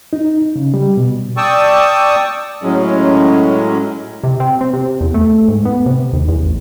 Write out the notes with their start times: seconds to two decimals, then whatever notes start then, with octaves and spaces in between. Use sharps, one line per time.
0.13 D#4
0.56 C#3
0.74 G3
0.97 B2
1.37 D5 G5 A5 C#6 D#6 E6
2.63 A2 F#3 G#3 C#4
4.24 C3
4.40 C4
4.61 C4
4.73 C3
5.01 E2
5.14 A3
5.48 G#2
5.65 B3
5.86 C3
6.13 D#2
6.28 E2
6.41 A1